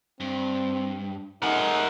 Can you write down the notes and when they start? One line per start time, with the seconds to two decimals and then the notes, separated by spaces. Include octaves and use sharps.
0.20 G2 C4
1.43 A3 D#4 G#4 A#4 F#5